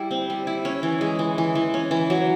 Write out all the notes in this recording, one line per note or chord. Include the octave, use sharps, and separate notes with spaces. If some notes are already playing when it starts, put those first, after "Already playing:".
Already playing: G3 E4
C4
G3
E4
C#4
E3
G#3
E3
E3
E3
C#4
E3
F#3